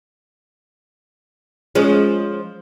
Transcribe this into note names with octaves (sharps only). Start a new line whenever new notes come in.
F3 G#3 C#4